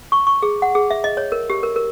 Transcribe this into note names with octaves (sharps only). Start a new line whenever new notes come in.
C#6
C#6
G#4
F#5
G#4
E5
D#5
C#5
A#4
G4
A#4
A#4